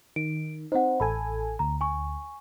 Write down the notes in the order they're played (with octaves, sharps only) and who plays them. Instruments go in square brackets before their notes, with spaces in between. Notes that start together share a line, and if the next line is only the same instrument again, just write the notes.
[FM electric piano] D#3 [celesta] D7
[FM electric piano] C4 D#4 [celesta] C5 F#5
[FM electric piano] A1 A4 G#5 [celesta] B5
[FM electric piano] D2 [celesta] A#5
[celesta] G#5 C#6